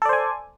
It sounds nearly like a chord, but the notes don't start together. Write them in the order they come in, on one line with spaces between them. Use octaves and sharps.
A4 D5 C5 G#5